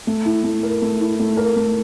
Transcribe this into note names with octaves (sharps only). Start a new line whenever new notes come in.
A3
E4
A3
A#4
A3
E4
A3
A#4
A3